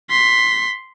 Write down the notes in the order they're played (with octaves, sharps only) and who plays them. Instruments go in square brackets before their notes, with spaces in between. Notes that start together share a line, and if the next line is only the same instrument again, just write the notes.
[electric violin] C6 B6